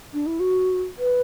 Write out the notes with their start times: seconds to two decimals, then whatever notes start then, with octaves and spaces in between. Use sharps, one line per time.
0.13 D4
0.26 E4
0.40 F#4
0.98 B4